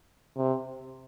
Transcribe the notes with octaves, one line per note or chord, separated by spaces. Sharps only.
C3